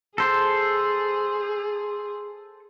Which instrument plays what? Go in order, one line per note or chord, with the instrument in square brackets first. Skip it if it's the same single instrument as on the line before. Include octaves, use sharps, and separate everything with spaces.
[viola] G#4 [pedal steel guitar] A4 C5